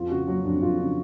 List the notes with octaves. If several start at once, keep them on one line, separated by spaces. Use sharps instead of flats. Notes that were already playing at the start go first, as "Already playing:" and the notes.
Already playing: F2 F4
C#3 F#4
F#3 F#4
F2 D4
F2 F4
C#3 D4